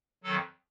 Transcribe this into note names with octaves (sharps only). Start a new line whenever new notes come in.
F2 D#3 F#3 A4